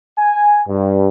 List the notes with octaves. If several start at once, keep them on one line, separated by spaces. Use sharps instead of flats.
G#5
G2